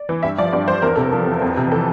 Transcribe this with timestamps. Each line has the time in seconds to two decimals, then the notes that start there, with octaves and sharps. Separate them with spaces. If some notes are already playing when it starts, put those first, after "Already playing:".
Already playing: D5
0.09 E3
0.23 G2 E5
0.38 F3 D5
0.53 G2 D5
0.68 F3 C5
0.82 E2 A#4
0.96 C3 A4
1.09 F3 A#4
1.27 E2
1.42 F2
1.57 C3
1.72 E3 A4